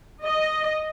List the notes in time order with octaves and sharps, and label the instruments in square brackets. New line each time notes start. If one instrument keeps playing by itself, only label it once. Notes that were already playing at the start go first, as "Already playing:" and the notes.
[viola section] D#5